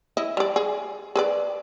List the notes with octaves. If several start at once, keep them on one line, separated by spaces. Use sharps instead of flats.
E4 D#5
G3 D5
G#4
G#4 B4 D5